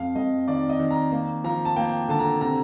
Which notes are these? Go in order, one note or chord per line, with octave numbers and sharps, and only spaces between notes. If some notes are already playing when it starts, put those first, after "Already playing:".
Already playing: F2 F5
F2 D#5
D#3 D5
D#5
D#3
A#5
A#3
F3 A#5
A5
A#3 G5
D3 A5
A#5
C3 A#5